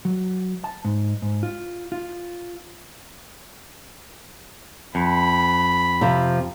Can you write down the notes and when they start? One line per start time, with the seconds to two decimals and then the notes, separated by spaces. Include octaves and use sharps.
0.05 F#3
0.64 A5
0.85 G#2
1.22 G#2
1.43 F4
1.92 F4
4.95 F2 B5
6.01 C3 F3